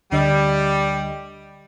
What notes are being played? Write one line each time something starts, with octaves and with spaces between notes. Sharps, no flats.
D2 D3 G3 D#5